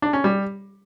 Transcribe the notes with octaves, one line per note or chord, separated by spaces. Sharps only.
D4
C#4
G3